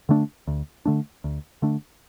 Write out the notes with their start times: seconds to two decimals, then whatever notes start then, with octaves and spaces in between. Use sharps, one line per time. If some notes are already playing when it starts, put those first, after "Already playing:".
0.09 D3 A3 D4
0.47 D2
0.85 D3 A3 D4
1.24 D2
1.62 D3 A3 D4